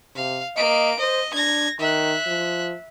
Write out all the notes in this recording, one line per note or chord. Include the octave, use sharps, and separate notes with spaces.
C3 F5
A#3 D#5 D7
C5 D#5
D4 G#6 A#6
D#3 E5 F#6
F3